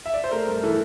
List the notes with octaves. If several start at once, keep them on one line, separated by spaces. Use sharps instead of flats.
E5
D5
C5
A3 A#4
G2
E3 A4